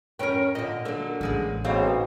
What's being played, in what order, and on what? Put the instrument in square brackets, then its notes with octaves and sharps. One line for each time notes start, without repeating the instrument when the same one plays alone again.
[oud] F2 C#4 B4 [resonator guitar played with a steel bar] A#4 G5
[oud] A#2 D3 [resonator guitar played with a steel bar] D#5
[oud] D3 A#3 [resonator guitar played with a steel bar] F#3 A4
[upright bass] A1 [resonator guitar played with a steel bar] C#3 G#3 G#4
[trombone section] B1 [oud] C#3 A3 C#4 [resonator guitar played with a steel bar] C4 C5 F5